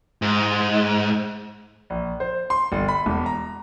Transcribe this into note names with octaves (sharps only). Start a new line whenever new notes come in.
G#2
A#1
C5
C6
G1
B5
E1
A#5